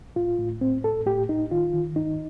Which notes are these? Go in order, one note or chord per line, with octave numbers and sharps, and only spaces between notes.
A2 F4
A2
A2 C4
A2 A4
A2 G4
A2 D#4
D#3 F4
D#3
G2 D#4